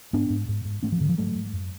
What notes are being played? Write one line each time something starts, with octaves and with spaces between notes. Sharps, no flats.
G#2 B3 D4
G#2
G#2
G#2
G#2 A3 C#4
F3
G#2 D3
F3
G#2 F#3 A3
G#2
F#2